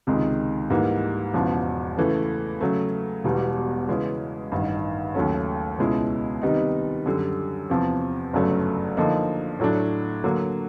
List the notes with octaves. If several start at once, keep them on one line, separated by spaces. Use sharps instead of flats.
C#2 C3 D#3 G#3
G#2 E3 G3 A#3
E1 E2 C#3 F3
C#3 E3 A3
C#3 F#3 A3
E1 E2 B2 G3
C#3 E3 G#3 C#4
A1 G2 D#3
D#2 C#3 F#3 A3 C#4
C#2 B2 G#3 C#4 E4
C3 D#3 G3 B3 D#4
F#2 D3 G3
E2 C3 F3
G1 F#2 C#3 F#3 A3
D3 F3 A#3 D#4
A2 F#3 A3 D4
D3 F#3 A#3